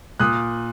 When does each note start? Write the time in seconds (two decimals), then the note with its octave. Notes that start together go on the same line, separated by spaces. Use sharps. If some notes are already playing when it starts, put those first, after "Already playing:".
0.20 A#2 D#6 F#6